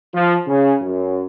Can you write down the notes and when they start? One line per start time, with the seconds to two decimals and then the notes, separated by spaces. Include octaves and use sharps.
0.14 F3
0.46 C#3
0.81 F#2